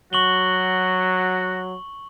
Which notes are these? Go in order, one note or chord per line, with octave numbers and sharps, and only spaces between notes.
F#3 F#4 C#6 F#7 G7